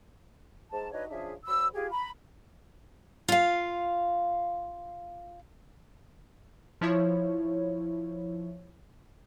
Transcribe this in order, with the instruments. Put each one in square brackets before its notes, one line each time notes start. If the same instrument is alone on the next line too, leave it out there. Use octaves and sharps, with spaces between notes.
[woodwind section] G#2 A5
D4 D#4 F#4 B4 C#5 D#5
C#3 F3 D4 G#4 E5
D2 F#3 B5 E6
F4 G4 G#4
A#5 B5
[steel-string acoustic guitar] F4 F5
[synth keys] F3 E4 C#5